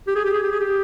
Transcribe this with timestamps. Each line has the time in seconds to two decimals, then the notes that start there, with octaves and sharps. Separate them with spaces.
0.07 G4
0.16 G#4
0.25 G4
0.33 G#4
0.43 G4
0.51 G#4
0.60 G4